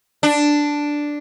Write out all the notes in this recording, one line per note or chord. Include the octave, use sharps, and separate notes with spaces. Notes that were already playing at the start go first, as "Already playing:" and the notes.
D4